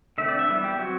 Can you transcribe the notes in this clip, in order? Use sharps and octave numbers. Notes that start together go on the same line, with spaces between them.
D3 A3 C4 E5
D5
E5
E3 G3 B3
G4
F#3 C4 F#4